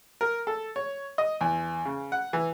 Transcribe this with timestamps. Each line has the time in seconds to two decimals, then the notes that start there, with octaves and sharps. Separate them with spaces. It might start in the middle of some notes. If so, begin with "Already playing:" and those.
0.21 A#4
0.47 A4
0.76 C#5
1.18 D#5
1.41 E2
1.85 C#3
2.12 F#5
2.33 E3